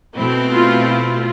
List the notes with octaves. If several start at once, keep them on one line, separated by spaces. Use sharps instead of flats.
B2 A3 C4 E4
F4
F4